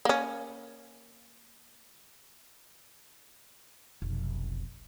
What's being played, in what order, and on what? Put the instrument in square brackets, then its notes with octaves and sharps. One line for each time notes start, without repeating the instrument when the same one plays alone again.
[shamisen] A#3 C#4
[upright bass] F1 B1